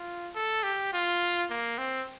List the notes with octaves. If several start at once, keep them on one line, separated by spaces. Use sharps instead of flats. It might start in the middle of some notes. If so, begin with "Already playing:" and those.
Already playing: F4
A4
G4
F4
A#3
C4